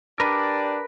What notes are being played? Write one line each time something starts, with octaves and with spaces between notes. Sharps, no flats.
D4 G4 A#4 B4 D5